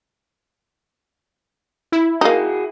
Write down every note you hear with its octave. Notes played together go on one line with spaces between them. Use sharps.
E4
A#3 D#4 F#4 G#4